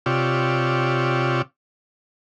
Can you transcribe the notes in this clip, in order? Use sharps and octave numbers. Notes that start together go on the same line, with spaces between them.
C3 F4 G4 C#5 D5 E6